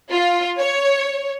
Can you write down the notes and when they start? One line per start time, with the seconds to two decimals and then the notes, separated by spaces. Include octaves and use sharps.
0.13 F4
0.59 C#5